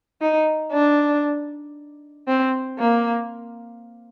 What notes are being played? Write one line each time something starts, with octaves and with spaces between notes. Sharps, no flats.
D#4
D4
C4
A#3